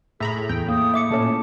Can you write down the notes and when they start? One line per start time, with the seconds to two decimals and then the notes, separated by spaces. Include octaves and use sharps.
0.20 A2 G#4 E5 A#5 B5
0.49 E2 G5
0.68 A#3 D#6
0.94 E5 D6 C#7
1.11 A#2 A3 C#4 A5